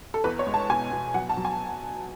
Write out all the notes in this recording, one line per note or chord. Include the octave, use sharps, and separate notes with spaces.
A4
E2 B4
C#5
G#3
A5
B2 G#5
B2
F#3 F#5
A5
F#3
G#5